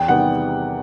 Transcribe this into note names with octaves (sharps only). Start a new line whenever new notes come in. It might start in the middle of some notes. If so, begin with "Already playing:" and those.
Already playing: E2 G5
C3 D#3 G3 B3 F#5